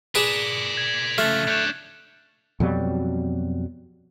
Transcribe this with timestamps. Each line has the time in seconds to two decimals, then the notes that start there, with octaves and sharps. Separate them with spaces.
0.15 D4 G#4 A#4 B4 D5 B6 E7 F7
0.77 G#6
1.18 C#3 F3 A3 F6 F#6 A6
1.48 D4 C#5 F#6 G6 E7
2.60 F2 B2 F#3 G3